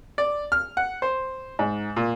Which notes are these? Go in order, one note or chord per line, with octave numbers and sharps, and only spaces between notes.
D5
F6
F#5
C5
G#2
A#2